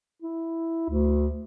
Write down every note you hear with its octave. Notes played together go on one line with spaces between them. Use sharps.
E4
D2